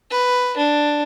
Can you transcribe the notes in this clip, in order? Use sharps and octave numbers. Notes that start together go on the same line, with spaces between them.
B4
D4